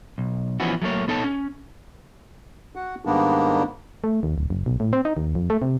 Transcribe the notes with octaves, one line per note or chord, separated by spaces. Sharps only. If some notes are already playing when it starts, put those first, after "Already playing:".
B1
E3 F3 B3 C#4 E4 F#4
F#3 A3 A#3 C#5
B3 D#4 A4 C#5 A5
C#4
F#4 F#5
G#2 D#3 G3 A#3 B3 D4
A3
D#2
D1
F#1
B1
A2
C4
D#4
D#2
F2
A3
C3